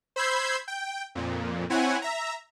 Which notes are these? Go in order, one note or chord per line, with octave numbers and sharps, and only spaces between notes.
C5 B5 E6 G6 G#6 C7
G5
F2 A#2
C4 E4 C#5 F#5 G#5
E5 A#5